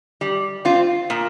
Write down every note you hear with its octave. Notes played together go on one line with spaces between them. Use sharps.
G3
C4 F4
A#2